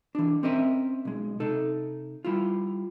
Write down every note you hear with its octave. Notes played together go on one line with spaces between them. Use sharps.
E3 D4
C4 C#4 A#4 D#5 E5
B1 G#3
C3 D#4 A4
G3 E4 F4